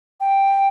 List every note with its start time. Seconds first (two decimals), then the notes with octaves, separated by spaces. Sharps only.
0.20 G5